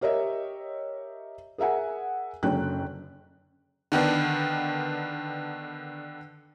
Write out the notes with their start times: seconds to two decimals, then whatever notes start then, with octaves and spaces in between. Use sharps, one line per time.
0.01 G4 A#4 C#5 D#5 E5
1.58 G#4 A#4 E5 F#5 G#5
2.43 F#1 F#2 D3 C#4 G5 F#6
3.92 D3 D#3 B3 D4